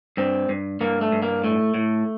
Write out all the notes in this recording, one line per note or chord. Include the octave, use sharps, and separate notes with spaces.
G2 C4
G2
G2 A#3
A3
G2
A#3
A2 A3
A2